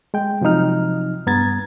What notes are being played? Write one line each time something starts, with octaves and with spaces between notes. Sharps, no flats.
G#3 G5
C3 F3 F#3 D#4 F6
G2 B3 A#5 G#6 A6